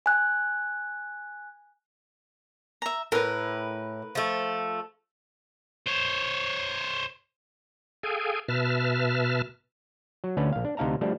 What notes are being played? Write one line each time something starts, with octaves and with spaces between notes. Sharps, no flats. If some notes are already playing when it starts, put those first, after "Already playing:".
G#5 F#6
E5 A#5
A2 A#4 B4
F3 A3
C5 C#5
G#4 A4 F5 G5 G#5
B2 B4 E5 A5 F6
F#3
D2 D3 A3 C#4 B4
A#1 F5
D4
D2 C3 D#4 F5 A5 A#5
F3 G3 A3 D4